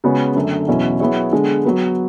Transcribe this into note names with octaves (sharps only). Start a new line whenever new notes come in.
C#3 G#3 B3 F#4 C#5
F#2 D3 A3
E2 B2 F#3 C#4 E4
F#3 B3 E4 G#4 C#5
D3 G#3 B3 D4 G#4
F#3 B3 F#4 B4